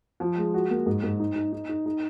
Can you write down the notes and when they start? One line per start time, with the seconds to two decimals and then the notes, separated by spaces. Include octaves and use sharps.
0.20 F3
0.37 G#3
0.54 F#4
0.70 A#3
0.86 G#2
1.03 G#2
1.20 D#4
1.36 D#4
1.52 D#4
1.69 D#4
1.86 D#4